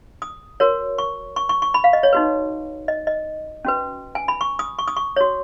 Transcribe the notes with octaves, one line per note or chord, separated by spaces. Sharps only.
D#6
F#4 A#4 C#5
C#6
C#6
C#6
C#6
B5
F5
D#5
C#5
D#4 F#4 B4
D#5
D#5
C#4 F#4 B4
G#5
B5
C#6
D#6
C#6
D#6
C#6
F#4 C#5